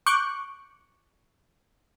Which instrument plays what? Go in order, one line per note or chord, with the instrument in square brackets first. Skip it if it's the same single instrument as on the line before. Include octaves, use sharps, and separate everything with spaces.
[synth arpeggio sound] C#6 D6 F#6 G6 C#7